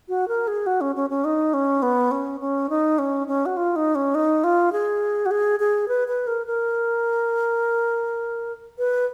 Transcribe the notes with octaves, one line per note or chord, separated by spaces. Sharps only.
F#4
A#4
G#4
F#4
C#4
C#4
C#4
D#4
C#4
B3
C#4
C#4
D#4
C#4
C#4
F#4
F4
D#4
C#4
D#4
F4
G#4
F#4
G#4
G#4
B4
B4
A#4
A#4
B4